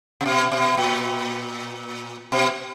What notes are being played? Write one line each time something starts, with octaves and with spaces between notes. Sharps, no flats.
C3
B2
B2
A#2
B2